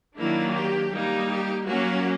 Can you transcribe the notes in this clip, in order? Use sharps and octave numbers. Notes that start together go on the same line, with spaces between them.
D#3 F#3 A#3 D4 E4
G4
G3 A#3 D#4
G4
F#3 A#3 C#4 F#4